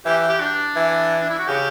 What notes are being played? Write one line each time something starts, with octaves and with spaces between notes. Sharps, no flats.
E3 G4
G4
D4
E3
D4
E4
F#4
C#3 G4